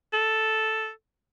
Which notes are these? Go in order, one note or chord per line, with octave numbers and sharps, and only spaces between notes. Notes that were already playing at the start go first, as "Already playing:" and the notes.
A4